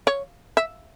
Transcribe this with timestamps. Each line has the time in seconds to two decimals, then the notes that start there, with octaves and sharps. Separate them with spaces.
0.07 C#5
0.57 E5